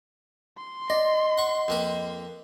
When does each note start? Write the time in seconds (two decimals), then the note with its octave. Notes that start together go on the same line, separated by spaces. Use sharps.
0.58 C6
0.90 D5 D#5
1.38 F#5 C#6
1.68 F2 A#3 B4